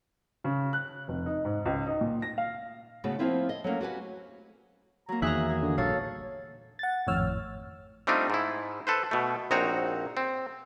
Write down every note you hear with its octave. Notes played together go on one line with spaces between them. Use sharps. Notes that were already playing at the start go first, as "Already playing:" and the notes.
C#3
F#6
F1
D#4
G#2
C#2
D#4
A#2
A#6
F5
C#3 A3 B3 F#4
F3 G3 A#3 C4 E4 F4
D#5
F#3 A3 A#3 C#4
F#4 G4 B4 G#5
F#3 A#3 A#5
E2 D#3 G#4 E5 A#5 E6 F#6
F#3 G#4
D3
A#1 G2 A#2 A4 C#5 F5
F#5 A6
G#1 F2 A2 C#5 E6 F6
G3 A3 C4 D4 D#4 F4
G#2 E4
A4 B4 C5
B2 A3
A#1 C4 D#4 F#4 C#5 A#5
C4